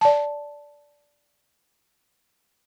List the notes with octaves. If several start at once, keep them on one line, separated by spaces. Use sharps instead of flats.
D5 A5